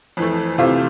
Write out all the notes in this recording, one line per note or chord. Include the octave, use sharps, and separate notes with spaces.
F2 E3 A3
C3 E3 A3 C4 F4